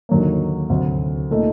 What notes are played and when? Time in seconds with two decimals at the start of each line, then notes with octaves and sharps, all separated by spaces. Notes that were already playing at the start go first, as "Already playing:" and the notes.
0.09 D#2 D3 F#3 A#3
0.70 D2 C3 F#3
1.31 A#2 A3 D#4